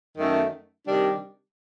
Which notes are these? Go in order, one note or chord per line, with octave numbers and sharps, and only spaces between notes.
F#2 D#3 A3
C3 D#3 G3 D4